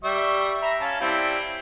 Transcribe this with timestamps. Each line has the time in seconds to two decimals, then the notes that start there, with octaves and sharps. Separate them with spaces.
0.04 G3 E5 C#6
0.62 E5 A#5 B5
0.81 C#4 F5 A5
1.00 G3 C4 E4